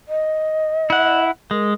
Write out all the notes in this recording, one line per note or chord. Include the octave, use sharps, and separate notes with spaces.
D#5
E4 F#5
G#3 A#4